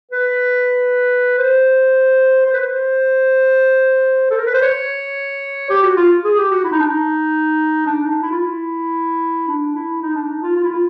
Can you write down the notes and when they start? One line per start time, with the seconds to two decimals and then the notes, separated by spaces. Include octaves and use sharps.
0.11 B4
1.38 C5
2.46 C5
2.53 B4
2.62 C5
4.30 A4
4.38 A#4
4.46 B4
4.54 C5
4.62 C#5
5.70 G4
5.83 F#4
5.97 F4
6.24 G#4
6.38 G4
6.51 F#4
6.64 E4
6.72 D#4
6.80 D4
6.88 D#4
7.86 D4
8.04 D#4
8.22 E4
8.31 F4
8.41 E4
9.48 D4
9.75 E4
10.02 D#4
10.15 D4
10.29 D#4
10.42 F4
10.56 F4
10.64 E4
10.71 F4